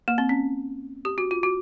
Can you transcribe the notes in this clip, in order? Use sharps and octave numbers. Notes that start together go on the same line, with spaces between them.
A#3
C4
C#4
G4
F#4
F4
F#4